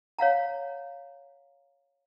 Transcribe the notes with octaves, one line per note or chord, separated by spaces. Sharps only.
C#5 F5 F#5 A#5